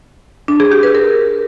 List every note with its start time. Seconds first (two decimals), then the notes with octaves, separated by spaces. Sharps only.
0.48 D4
0.60 G#4
0.71 G4
0.83 B4
0.95 A#4